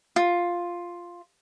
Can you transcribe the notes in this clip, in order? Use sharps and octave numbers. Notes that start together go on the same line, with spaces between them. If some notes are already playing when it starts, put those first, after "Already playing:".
F4